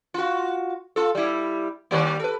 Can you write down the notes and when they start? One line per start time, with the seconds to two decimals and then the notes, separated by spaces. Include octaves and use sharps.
0.14 F4 F#4
0.96 F4 A4
1.15 G3 E4
1.91 D#3 G3 A#3
2.19 A4 B4